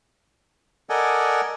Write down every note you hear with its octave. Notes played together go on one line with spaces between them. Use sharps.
A4 A#4 D5 D#5 F#5 G#5